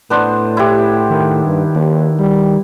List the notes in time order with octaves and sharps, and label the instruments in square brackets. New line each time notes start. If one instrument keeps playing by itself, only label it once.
[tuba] A2 [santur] B3 D4 C5
[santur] E4 G4
[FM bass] D#3
[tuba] G2
D#2
G3